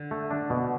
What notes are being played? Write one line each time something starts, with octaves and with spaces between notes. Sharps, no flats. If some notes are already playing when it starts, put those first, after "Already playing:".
Already playing: D3
A3
D4
B2